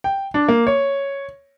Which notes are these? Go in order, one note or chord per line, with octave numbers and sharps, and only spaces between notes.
G5
D4
A#3
C#5